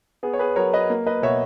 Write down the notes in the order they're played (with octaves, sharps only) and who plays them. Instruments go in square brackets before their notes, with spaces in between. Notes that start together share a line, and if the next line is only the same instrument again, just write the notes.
[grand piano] B3 G#4
C#5
G#4 B4
F#3 A#4 C#5
B4 D#5
A#3
B4 D#5
B2 C#5 E5